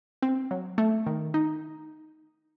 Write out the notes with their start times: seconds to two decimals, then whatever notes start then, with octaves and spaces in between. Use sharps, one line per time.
0.22 C4
0.51 F#3
0.78 A3
1.06 D#3
1.34 D#4